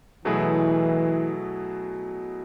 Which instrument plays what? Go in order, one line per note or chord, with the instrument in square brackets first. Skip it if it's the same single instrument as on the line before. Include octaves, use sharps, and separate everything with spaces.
[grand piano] B2 F#3 A3 E4 G#4 [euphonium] E3